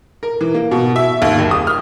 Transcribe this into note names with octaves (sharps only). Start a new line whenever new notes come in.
A#4
E3
A#3
B2
E5
D#2
F#1
D#6
F6